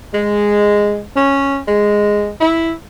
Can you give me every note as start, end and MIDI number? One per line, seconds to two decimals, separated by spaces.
0.12 0.99 56
1.15 1.56 61
1.67 2.27 56
2.40 2.70 64